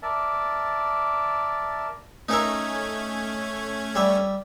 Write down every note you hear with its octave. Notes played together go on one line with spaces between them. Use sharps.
A#4 D5 E5 A5
A3 C#4 D#4 A#4 E5 G#6
G3 E5